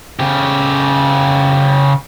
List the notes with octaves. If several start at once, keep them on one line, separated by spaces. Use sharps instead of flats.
C#3 G4